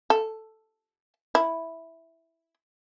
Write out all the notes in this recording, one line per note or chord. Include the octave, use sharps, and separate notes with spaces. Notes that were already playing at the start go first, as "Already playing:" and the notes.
A4
E4